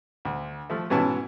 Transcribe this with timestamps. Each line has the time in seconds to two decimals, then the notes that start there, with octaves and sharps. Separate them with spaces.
0.25 D2
0.70 F3 A3
0.90 G#2 B2 E3 C#4 A5